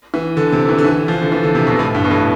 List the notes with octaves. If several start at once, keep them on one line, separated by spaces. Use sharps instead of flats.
E3
D3
C3
E3
D3
E3
F3
D3
E3
D3
C3
B2
A2
G2
B2
A2